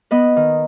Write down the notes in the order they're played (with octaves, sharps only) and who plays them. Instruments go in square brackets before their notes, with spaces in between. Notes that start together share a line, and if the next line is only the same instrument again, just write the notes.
[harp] B3 B4 D#5
D#3